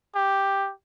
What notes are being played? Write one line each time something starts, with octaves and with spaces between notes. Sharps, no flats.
G4